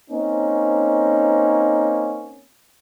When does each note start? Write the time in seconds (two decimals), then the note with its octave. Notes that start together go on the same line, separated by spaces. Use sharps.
0.10 A#3 C4 C#4 D#4